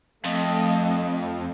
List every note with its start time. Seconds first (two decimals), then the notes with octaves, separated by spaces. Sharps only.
0.25 F2 A3 D#5